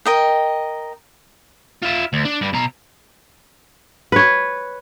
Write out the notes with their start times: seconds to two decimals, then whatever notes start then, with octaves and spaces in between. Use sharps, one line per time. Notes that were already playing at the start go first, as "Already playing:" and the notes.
0.05 A#4 D#5 G5
1.83 F4 E5
2.13 D2
2.25 D4
2.41 G2 G3
2.53 B2 A#5
4.12 B4 C#5